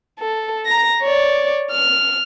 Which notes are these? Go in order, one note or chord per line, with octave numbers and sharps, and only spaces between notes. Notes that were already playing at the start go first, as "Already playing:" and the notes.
A4
A#5 A#6
C#5 D5
F6